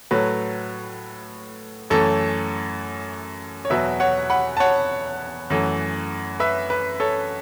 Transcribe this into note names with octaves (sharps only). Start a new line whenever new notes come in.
A2 F#3 A3 B4
F#2 E3 A3 A4 C#5
C#5
E2 B2 F#3 B4 E5
C#5 F#5
F#5 B5
A5
C#5 F#5
F#2 E3 A3
B4 E5
B4
A4 C#5